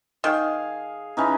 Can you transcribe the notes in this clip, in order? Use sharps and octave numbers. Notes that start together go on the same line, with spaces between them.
D#3 G#4 F5
E3 C#4 D#4